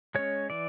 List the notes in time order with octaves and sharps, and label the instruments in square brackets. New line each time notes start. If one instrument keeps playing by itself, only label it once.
[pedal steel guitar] G#3 C#4 C#5
E3 D5